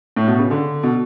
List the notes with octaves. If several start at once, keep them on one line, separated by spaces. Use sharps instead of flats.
A2
B2
C#3
D3
B2